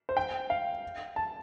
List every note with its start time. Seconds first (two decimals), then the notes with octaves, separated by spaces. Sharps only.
0.09 C5
0.17 G5
0.50 F5
1.16 A5